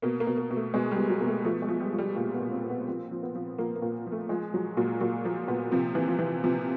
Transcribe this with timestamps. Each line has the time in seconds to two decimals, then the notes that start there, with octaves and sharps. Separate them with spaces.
0.02 B2 A#3
0.20 A#3
0.27 B2
0.38 A#3
0.51 B2
0.56 A3
0.74 B2 G#3
0.91 G3
0.98 B2
1.10 F#3
1.20 B2 A#3
1.27 A3
1.45 F3 A3
1.62 G#3
1.68 F3
1.80 G3
1.93 F3
1.98 G3
2.16 A#2 G3
2.34 B3
2.39 A#2
2.52 C4
2.64 A#2
2.70 B3
2.88 F3 C4
3.11 F3
3.23 B3
3.35 F3
3.58 F3 A#3
3.76 A#3
3.82 A#2
4.06 F3
4.12 A3
4.29 F3 G#3
4.54 F3 F#3
4.77 A#2 F#3
5.00 A#2 F#3
5.24 F3 A#3
5.48 A#2 B3
5.72 C3 F3
5.95 E3
6.08 F3
6.19 E3
6.44 C3 F3